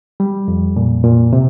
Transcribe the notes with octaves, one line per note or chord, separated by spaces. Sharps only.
G3
F2
A#2
A#2
C3